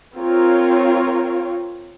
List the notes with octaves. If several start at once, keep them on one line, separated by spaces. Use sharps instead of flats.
C4 F4 A#4 C#5